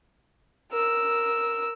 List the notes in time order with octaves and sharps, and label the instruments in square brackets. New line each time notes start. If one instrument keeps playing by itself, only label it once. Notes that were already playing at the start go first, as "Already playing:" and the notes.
[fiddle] A#4 E6